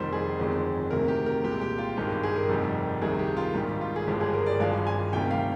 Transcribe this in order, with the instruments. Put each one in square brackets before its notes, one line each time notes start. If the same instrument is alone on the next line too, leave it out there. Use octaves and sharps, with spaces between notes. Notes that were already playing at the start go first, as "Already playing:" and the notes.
Already playing: [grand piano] F1 F2 D#3 G3 C5
G#4
G1 F2 D#3 G#3
D2 C3 D#3 A#4
G4
A#4
C2 A#2 G#3 G4
G4
F4
G#1 G2 D#3 G#3 G4
G#4
A#4
F1 F2 D#3 G3
C2 C3 D#3 G#4
G4
F4
G#1 G#2 D#3 G3
F4
G#4
G1 G2 F3 G#3 G4
G#4
A#4
D5
G#1 G2 F3 G#3 F5
G#5
D2 C3 D#3 G3 G5
F5